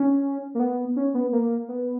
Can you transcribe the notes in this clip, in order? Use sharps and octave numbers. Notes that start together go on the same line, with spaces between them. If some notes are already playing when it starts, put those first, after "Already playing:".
Already playing: C#4
A#3
B3
C#4
B3
A#3
B3